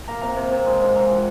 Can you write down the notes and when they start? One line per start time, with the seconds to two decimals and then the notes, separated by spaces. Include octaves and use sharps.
0.08 A#3 A#5
0.22 C3 A#5
0.37 C3
0.52 C3
0.66 G#3
0.81 G#2
0.95 G#2 A#5
1.05 G#5
1.10 F3 F#5